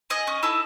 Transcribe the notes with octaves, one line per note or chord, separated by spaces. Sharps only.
G#4 D#5
C#4
E4 A4